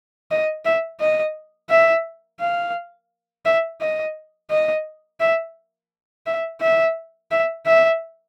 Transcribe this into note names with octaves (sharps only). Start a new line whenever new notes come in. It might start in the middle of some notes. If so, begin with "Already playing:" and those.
D#5
E5
D#5
E5
F5
E5
D#5
D#5
E5
E5
E5
E5
E5